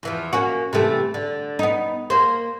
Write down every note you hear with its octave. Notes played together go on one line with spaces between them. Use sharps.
E2 E3 F3
A#3 C#4 F#4
C3 E3 A3
D3
B3 D#4
A#3 C5